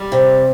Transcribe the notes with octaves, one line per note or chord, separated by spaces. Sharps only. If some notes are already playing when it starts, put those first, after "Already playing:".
Already playing: G3
C3